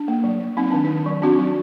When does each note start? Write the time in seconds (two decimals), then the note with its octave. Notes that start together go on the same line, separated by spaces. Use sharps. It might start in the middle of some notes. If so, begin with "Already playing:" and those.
Already playing: D4
0.08 A#3
0.24 F#3
0.40 F#3
0.57 C4 D#4
0.71 D#3 D4
0.84 D#4
0.90 D#3
1.06 F#3
1.22 C4 D4 F#4
1.39 F#3